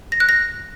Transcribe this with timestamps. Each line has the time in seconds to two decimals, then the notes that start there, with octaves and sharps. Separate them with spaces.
0.12 A#6
0.20 F#6
0.29 A#6